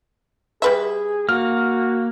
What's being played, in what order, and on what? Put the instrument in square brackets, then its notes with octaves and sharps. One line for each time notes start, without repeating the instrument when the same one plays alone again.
[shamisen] G3 B4 E5 [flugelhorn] G#4
[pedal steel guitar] A#3 [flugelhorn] F#4 [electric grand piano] F6